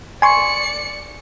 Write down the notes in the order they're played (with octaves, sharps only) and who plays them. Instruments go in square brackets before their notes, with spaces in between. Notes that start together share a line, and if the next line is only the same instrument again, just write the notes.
[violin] D5 C#7 [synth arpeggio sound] G#5 C6 C#6